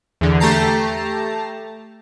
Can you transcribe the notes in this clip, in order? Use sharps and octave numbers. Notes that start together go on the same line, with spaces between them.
E2 D3
A3 G4 A5 A#5 C7